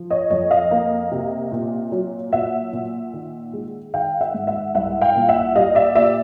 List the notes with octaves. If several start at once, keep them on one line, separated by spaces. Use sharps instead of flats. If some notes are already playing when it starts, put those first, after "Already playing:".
Already playing: F3
C#5 D#5
F2 C#5 D#5
D#5 F5
A#3
C3
A#2
F#3
A#2 E5 F#5
A#2
D#3
G#3
D#3 F5 G5
E5 F#5
G#2
E5 F#5
C2 E5 F#5
F5 G5
A#2
E5 F#5
G3 D#5 F5
D5 E5
A#2 D5 E5